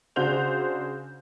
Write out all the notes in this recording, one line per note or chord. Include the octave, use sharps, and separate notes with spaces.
C#3 D4 F#4 C5 G6 F7